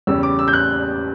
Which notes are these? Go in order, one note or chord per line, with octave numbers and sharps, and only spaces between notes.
E2 C#3 G3 C#4 E6
D6
E6
G6
F#6